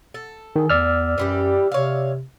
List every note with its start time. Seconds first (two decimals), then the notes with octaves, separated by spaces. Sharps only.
0.14 A4
0.56 D#3 G#4
0.70 E2 D5 E6 F6
1.18 F#2 E3 G3 G4
1.72 C3 C#5 F5